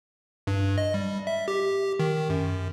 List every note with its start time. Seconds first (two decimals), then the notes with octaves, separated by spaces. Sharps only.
0.47 G2
0.78 D#5
0.94 G3
1.27 E5
1.48 G4
1.99 D#3
2.30 F#2